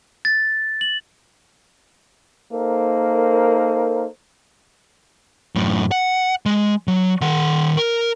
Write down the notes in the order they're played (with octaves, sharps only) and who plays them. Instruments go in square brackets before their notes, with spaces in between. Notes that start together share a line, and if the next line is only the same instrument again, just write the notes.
[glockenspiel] A6
F#7
[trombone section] A#3 D#4 A4 A#4 C5
[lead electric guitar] F#2 A2
F#5
G#3
F#3
D#3 F#5
A#4